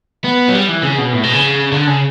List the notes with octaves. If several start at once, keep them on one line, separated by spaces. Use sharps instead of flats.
B3
F#3
G3
E3
C#3
B2
A2
B2
C#3
D3
C#3